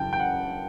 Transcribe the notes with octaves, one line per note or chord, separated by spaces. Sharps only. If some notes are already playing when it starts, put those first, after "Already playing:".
Already playing: F#2 C#3 E3 G5 A5
G5
F#5